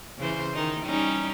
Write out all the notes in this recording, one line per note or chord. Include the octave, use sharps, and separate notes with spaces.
C#3 E3 C5
D#3 D#4
G3 C#4 D#4